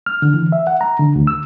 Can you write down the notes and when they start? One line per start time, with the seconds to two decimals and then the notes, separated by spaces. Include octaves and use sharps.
0.06 F6
0.22 D3
0.34 E3
0.52 E5
0.67 F#5
0.81 A#5
0.99 D3
1.16 D2
1.27 E6